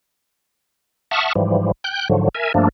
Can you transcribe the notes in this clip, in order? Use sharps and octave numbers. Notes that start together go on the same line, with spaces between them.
E5 F#5 A5 C#6 D#6 F6
G#2 E3 F3 G3
G5 F#6 G6
G#2 D3 F3 F#3
A#4 E5 G#5
G2 F3 A3 A#3 D4